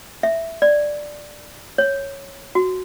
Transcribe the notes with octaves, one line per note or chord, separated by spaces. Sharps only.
E5
D5
C#5
F#4